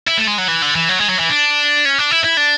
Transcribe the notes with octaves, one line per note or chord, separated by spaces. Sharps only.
E4
A3
G#3
F#3
E3
D3
E3
F#3
G#3
F#3
E3
D4
C#4
D4
E4
E4
D4